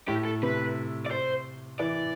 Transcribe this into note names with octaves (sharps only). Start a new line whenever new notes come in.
A2 G4
A4
C3 B4
D5
C5
E3 D5